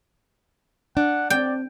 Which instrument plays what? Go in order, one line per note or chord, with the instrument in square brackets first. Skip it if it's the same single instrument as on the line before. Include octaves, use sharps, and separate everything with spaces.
[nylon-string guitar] D4 [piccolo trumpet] F#5
[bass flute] C4 [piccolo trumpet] D5 [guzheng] G5